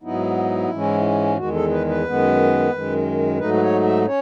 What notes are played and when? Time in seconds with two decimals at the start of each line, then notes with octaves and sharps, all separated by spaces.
0.03 G#2 F#3 B3 D#4 E4
0.70 G#2 E3 G#3 C#4
1.37 E2 D#3 G#3 F#4
1.54 A4
1.71 B4
1.88 B4
2.05 F#2 D#3 G#3 B3
2.72 F#2 D#3 G#3
3.39 G#2 F#3 A3 D#4 B4
3.54 B4
3.61 C#5
3.84 E5
4.06 C#4 C#5